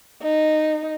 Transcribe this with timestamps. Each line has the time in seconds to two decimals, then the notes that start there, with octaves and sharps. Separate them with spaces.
0.23 D#4